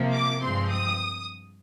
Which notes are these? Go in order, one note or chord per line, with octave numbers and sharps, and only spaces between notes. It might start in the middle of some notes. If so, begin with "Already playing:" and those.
Already playing: C3 F3 A#3
D6
G2 F3 G#3 C4 C6
D#6